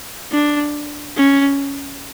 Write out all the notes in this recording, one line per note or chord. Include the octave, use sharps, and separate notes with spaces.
D4
C#4